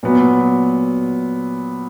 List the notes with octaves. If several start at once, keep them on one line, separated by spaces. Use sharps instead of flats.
A#2 F#3 B3